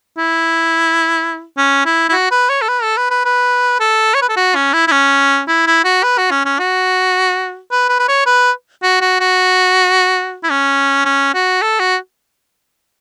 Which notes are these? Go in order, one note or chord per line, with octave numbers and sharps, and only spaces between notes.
E4
C#4
E4
E4
F#4
B4
C#5
A4
B4
A4
B4
B4
B4
A4
C#5
B4
A4
F#4
C#4
E4
E4
C#4
E4
E4
F#4
B4
F#4
C#4
C#4
F#4
B4
B4
B4
C#5
B4
F#4
F#4
F#4
E4
C#4
C#4
F#4
A4
F#4